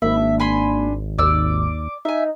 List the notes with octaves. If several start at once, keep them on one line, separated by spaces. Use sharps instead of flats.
G#1 A#3 E5 B5
D4
G#5 B5 C6
D#2 D5 D6 E6
D#4 E5 G#5